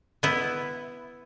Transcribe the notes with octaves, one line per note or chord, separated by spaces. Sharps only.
B3 E4